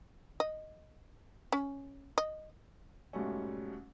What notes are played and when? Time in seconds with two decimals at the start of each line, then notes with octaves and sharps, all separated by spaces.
0.40 D#5
1.52 C#4
2.18 D#5
3.13 G#2 B2 G3 A3 C#4